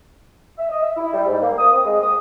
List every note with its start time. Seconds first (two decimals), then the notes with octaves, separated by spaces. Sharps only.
0.58 E5
0.69 D#5
0.82 E5
0.97 E4
1.13 G3
1.27 G#2
1.42 A#3
1.58 D#6
1.73 C4
1.85 G#3
2.01 D#6